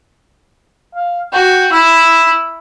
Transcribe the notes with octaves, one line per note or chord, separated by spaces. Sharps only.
F5
F#4 G5
E4 E6